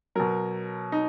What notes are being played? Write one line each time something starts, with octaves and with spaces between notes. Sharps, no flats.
B2 F#3 A#4
D#4